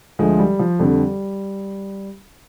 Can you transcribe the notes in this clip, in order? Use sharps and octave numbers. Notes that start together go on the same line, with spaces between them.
D2 D3 F3 G#3
G3
F3
F2 D3 G3